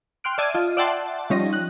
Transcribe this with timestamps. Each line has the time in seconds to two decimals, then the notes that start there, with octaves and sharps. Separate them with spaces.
0.24 G5 C6 F6 F#6 D7
0.38 D5 E5 A5 G#6 D#7
0.55 F4 D#5
0.77 D5 E5 F#5 G5 A5 C6
1.30 F3 G3 C#4 D#4 D#6 A#6
1.53 F#6